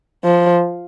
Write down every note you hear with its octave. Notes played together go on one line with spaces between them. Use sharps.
F3